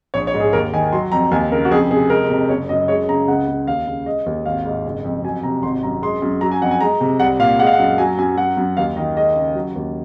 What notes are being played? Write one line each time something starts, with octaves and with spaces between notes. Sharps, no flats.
A#1 C#5
C#5
G#2
G#4
D#2 A#4
D#3 G#5
F#3 C6
F2 A#5
D#2 G#5
C#3 A#4
F#4
F2 G#4
C3 G#4
G#3 A#4
C3
F#1 C#5
F#2 D#5
G#3 C#5
C#3 A#5
C#2 F#5
C#3
D#2 F5
C#3
G#3 D#5
D#2
G#1 F5
G#2
F#1
F2
F#3 G#5
C3 A#5
G#1 C6
F#2 A#5
G#3 C6
F#2
F#3 A#5
G#5
F2 F#5
G#5
G#3 A#5
C3
C2 F#5
A#2 F5
G#3 F#5
F5
F#5
F#2
F#3 G#5
F#2 G#5
F#3 F#5
F#2
D#2 F5
D#3 D#5
G#3 D#5
C#3
F#3
D#2